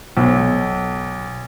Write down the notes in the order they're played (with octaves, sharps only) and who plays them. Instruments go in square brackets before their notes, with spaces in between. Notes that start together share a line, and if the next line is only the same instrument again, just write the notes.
[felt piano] B1